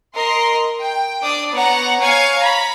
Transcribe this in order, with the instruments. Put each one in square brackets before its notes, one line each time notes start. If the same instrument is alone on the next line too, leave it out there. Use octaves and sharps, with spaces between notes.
[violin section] A#4 D#5 C6
G5
D4 D5 D6 D#6
B3 C#5 F#5 A#5
C#5 F5 G#5 G#6
A#5 B5